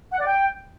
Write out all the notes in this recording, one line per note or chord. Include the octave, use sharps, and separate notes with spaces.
F#5
D5
G5